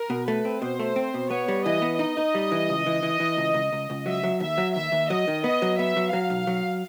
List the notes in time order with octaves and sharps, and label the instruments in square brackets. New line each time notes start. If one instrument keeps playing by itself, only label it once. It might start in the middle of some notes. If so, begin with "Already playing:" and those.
Already playing: [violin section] A#4
[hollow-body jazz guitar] B2
[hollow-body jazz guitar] A3 [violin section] B4
[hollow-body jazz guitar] C4
[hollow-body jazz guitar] B2 [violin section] C5
[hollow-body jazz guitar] A3
C4
B2
[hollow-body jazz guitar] B3 [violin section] C#5
[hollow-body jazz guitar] G3
[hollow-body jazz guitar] E3 [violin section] D#5
[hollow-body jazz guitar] B3
[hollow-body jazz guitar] D#4 [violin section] D#5
[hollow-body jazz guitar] D#4
G3
E3
C#2
E3
E3
E3
C#2
C#2
C#2
C#2
[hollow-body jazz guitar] F#3 [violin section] E5
[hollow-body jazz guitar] F#3
[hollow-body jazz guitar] D#2 [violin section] E5
[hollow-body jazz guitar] F#3
[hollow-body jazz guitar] D#2 [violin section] E5
[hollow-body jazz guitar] D#2
[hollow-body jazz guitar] F#3 [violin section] D#5
[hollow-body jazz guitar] D#3
[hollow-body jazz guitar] B3 [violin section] D#5
[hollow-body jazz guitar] F#3
[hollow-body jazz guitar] B3 [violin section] E5
[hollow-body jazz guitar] F#3
[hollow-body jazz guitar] F#3 [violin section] F5
[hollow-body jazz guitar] B1
F#3